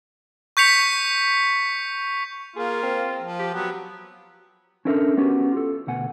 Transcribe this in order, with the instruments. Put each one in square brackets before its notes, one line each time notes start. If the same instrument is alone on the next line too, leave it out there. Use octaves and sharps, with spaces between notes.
[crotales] C#6 G6 B6 C#7 F7
[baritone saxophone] A#3 [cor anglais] F4 [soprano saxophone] G#4
[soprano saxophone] C4
[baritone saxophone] F3
[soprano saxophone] G4
[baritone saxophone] F#3 [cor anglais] B3 [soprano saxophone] G4
[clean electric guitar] C#4 D4 E4 A4 A#4 E5
B3 C#4 F#4 G4
F4 A4
D2 B2 F#5 G#5